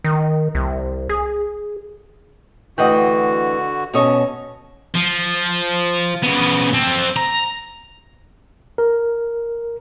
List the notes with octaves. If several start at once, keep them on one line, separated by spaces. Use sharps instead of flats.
D#3
C2
G#4
D2 D3 E3 F#4 D#5 F#5 G5
B2 C#4 A4 C#5 D#5 C#6
F3
C#3 B3
C4 A4
A#5
A#4